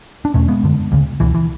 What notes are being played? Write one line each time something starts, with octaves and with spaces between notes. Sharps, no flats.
D4
E2 B2 A3 C#4
G#3 B3
F#2 D3
D2 C#3
C#2 B2 E3
E3